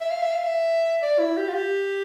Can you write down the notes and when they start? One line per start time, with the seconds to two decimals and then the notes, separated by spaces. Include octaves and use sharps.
0.01 E5
0.11 F5
0.22 E5
0.33 F5
0.44 E5
1.02 D5
1.19 E4
1.37 G4
1.49 F4
1.54 G4